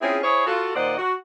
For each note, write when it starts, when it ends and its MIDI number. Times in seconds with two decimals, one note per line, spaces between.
0.01 0.18 60
0.01 0.18 61
0.01 0.18 64
0.01 0.18 65
0.01 0.18 68
0.23 0.44 64
0.23 0.44 68
0.23 0.44 72
0.23 0.44 73
0.46 0.73 65
0.46 0.73 66
0.46 0.73 69
0.75 0.98 46
0.75 0.98 51
0.75 0.98 72
0.75 0.98 74
0.75 0.98 75
0.75 0.98 78
0.98 1.14 66